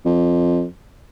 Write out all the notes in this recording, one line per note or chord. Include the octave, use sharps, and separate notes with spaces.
F2